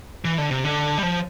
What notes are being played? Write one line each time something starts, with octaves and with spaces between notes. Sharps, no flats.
E3
D3
C3
D3
G3
F3